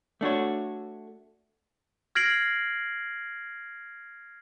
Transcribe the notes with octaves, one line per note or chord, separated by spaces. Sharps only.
A3 D4 F#4 C#5
F6 G#6 A#6 C7 D7 F#7